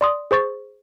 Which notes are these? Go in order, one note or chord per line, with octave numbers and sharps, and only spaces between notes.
D5 C6 D#6
G#4 C5 C#6 A6